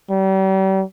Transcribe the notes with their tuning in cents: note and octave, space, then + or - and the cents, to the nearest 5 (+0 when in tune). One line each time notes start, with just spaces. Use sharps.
G3 -40